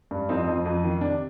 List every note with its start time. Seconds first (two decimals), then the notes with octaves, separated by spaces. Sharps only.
0.11 G2
0.29 F2 C4 D#4
0.47 F2
0.65 F2
0.84 D#3
1.01 C3 D4